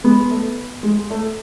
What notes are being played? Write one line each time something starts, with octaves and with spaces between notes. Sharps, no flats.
G#3 B3
A3
G#3
A3